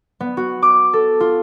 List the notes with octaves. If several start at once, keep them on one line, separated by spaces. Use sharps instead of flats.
B3
F#4
D6
A4
F4